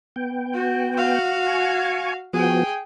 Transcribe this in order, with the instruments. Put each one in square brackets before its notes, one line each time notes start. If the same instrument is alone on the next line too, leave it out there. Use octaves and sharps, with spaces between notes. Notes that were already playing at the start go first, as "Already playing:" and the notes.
[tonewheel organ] B3 G5
[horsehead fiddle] F#4
F#4 F5
[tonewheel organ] G#5 C#6
[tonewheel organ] F3 B3 F#4 [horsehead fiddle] G#4 G5